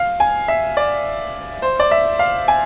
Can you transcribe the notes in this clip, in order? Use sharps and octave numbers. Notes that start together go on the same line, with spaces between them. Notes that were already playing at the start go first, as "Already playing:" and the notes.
Already playing: F5
G#5
E5
D5
C5
D5
E5
F5
G#5